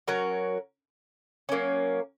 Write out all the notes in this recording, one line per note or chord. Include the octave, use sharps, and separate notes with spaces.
F#3 C#4 F#4 A#4
F#3 A#3 C#4